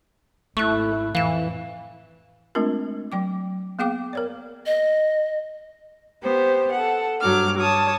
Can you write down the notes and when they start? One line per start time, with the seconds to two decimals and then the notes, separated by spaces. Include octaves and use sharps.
0.57 G#1 A3 E4 C#6 F#6
1.15 F2 A2 E3 F5 E7
2.55 G#3 A3 C4 D4 F4 A#4
3.12 F#3 G5 D6
3.79 A#3 B3 G#4 F5 G5 D6
4.13 A#4 C#5 D5
4.66 D#5
6.22 B3 G4 C5
6.73 A4 F#5
7.21 G2 F#3 D6 F6
7.60 C#5 A5 D#6